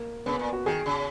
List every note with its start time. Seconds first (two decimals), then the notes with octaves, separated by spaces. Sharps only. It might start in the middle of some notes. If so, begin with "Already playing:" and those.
Already playing: A#3
0.26 C#3 B3
0.39 A#2
0.53 F#4
0.66 D#3 G#4
0.86 C#3